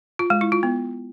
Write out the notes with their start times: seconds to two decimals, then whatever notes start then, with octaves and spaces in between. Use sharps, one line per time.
0.19 F4
0.30 G#3
0.41 E4
0.52 F4
0.63 B3